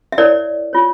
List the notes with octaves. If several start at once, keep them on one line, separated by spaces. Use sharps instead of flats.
E5
E4 A#4 C#5 D5
F4 C#5